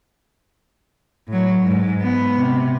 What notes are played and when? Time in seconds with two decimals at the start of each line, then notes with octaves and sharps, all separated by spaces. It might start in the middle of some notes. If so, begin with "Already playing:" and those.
1.28 A2 F#3
1.62 G#2
2.00 B3
2.35 C3